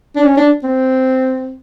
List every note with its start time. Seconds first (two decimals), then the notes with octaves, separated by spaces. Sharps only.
0.16 D4
0.24 C#4
0.37 D4
0.64 C4